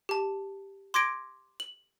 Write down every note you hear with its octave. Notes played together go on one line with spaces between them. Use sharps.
G4 A5
C6 D6 G#6 A#6 D7
F#7